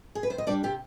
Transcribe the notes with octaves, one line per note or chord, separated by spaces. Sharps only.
G#4
B4
C3 C5
D#5
G3 D4 D5
C3 G4